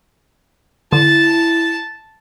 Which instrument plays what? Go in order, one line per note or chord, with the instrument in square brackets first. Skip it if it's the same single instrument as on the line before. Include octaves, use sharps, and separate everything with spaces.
[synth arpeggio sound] D3 [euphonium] E4 [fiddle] A5